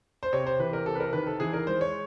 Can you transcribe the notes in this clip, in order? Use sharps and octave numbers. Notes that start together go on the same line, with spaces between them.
C5
C3 C#5
C5
E3 B4
A#4
C3 A4
B4
A#4
D#3 B4
A4
E3 G#4
A#4
G#3 C5
C#5